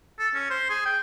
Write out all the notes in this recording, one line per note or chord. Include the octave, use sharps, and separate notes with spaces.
A4
C#4
C5
G#4
G5